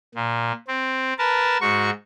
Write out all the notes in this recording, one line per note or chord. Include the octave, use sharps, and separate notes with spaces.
A#2
C4
A#4 B4 A5
G#2 F#4 C#6